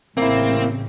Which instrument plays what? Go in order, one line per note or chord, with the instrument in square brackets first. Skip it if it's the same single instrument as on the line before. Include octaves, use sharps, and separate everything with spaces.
[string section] A1 C#3 [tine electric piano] A#3 E4 [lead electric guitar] C4